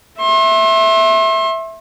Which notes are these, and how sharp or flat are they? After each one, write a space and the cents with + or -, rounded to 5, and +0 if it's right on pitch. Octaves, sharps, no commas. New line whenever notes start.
E5 +0 C6 +40